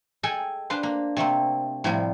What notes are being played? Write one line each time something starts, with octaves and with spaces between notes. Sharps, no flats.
G#4 A4 D#5 G5 G#5
D4 B4 C5 F5
A#3
C3 A3 A#3 C4
A2 C3 F3 G3